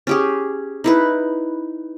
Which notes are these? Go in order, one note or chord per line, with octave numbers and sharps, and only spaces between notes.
C#4 G4 G#4
D#4 E4 B4